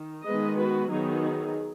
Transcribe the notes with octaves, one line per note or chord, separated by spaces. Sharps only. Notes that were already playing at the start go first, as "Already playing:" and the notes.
Already playing: D#3
D#3 G#3 B3 B4 D#5
F#4 B4
D#3 F#3 B3 D#4 G#4